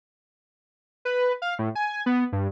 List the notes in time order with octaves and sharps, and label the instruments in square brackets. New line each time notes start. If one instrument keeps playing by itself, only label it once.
[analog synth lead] B4
F5
A2
G#5
B3
G2